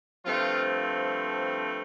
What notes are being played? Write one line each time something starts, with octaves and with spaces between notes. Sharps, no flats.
G2 F3 A3 C4 F4